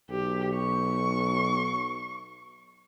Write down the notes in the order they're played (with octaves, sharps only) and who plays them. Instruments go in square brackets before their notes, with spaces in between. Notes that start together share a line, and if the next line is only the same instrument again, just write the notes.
[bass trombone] B1 [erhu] G4
[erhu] C#6